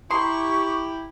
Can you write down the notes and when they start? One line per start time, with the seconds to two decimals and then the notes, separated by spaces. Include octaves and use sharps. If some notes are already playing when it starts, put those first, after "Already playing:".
0.11 E4 G4 A#5 C6 C#6 D#6